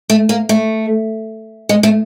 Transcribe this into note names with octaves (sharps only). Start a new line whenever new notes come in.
A3
A#3
A3
G#3
A3